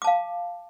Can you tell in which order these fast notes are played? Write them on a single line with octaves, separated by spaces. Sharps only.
D6 A5 F5